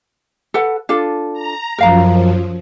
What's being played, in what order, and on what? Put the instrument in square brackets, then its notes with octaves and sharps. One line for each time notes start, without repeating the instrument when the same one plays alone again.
[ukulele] A4 B4 F#5
D4 F4 A4
[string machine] A#5
[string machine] F#2 F3 [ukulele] A#4 F5 A#5